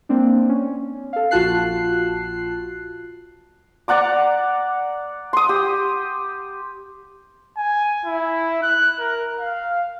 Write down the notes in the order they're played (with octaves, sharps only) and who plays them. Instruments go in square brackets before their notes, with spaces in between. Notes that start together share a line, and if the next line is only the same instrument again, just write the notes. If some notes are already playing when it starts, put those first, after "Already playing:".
[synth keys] A#3 C4 D4
C#4
A4 F5
A#1 F4 F#4 A5 F#6 C7
[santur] D5 F#5 A#5 D6
C6 D#6
G4
[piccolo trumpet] G#5
E4
F#6
A#4
F5